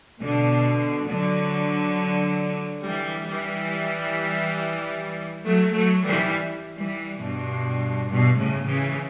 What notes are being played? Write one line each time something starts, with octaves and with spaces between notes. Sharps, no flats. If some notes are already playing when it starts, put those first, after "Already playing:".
B2 D3
D3 F#3
E3 G3
E3 G3
F#3 A3
F#3 A3
E3 G3
E3 G3
G2 B2
G2 B2
A2 C#3
C#3 E3